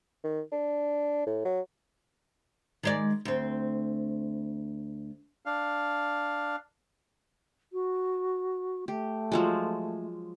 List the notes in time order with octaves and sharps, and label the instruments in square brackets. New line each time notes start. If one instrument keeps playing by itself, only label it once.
[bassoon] D#3
D4
A2
F#3
[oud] D#3 G#3 D5
D2 C4
[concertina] D4 F5
[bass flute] F#4
[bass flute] A3 [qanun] G4
[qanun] F3 F#3 G#3